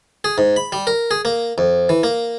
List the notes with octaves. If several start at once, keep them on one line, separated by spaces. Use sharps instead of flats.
G#4
G#2
B5
G3
A#4
G#4
A#3
F2
E3
A#3